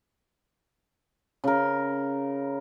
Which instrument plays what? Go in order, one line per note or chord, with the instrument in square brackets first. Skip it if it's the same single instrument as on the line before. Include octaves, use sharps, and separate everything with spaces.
[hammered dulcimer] C#3 A#4